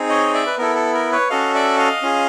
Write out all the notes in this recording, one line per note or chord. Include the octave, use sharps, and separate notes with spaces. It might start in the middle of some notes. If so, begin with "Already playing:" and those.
Already playing: C4 D#4 G#4
C#5 D#5
D5 E5
B4
B3 E4 A4 A#4
A4
A#4
B4 C#5
C#4 F#4 A4 D#5 F5
D5 E5
D#5 F5
C#4 F4 G#4